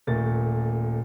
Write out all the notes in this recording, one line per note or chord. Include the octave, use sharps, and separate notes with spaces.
D#1 A#2 A3 A6